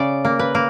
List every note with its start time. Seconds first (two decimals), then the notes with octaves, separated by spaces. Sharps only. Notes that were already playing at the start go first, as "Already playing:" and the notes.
Already playing: C#3 D5
0.25 A#3
0.39 B4
0.55 A#3